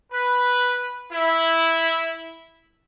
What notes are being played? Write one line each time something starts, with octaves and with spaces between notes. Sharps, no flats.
B4
E4